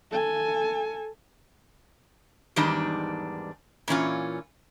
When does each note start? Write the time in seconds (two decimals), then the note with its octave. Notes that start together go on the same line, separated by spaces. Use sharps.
0.11 A4 G#5
2.56 E2 G#2 D#3 G3 D4
3.88 A#2 E3 C#4 F4